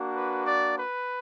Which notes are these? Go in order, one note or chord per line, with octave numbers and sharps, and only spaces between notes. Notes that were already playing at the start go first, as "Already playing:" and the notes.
Already playing: A#3 D4 F#4
B4
D5
B4